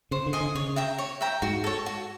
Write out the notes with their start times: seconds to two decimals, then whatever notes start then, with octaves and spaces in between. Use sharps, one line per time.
0.11 C#3 C5
0.26 D3
0.33 D#5 G#5 C6
0.41 D3
0.55 C#3 C#5
0.76 E5 G5 A#5
0.98 C#5
1.21 E5 G5 A#5
1.42 G#2 F#4
1.64 A4 C#5
1.86 F#4